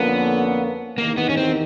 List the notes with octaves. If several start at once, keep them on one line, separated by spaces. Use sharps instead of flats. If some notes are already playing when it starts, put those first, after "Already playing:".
Already playing: F2 D3 F3 A#3 B3 C#4
E2 C3 D#3 A#3
B3
C#4
C4